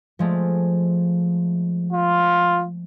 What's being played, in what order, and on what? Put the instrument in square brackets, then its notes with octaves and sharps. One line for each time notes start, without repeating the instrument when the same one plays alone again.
[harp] F3 G#3 A3
[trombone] F4